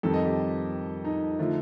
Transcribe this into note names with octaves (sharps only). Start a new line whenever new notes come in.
F2 D#3 G3 A4
D#5
G4
D#4
D3 F3 A3